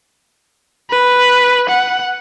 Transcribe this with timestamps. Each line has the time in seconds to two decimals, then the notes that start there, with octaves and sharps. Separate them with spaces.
0.90 B4
1.69 F#5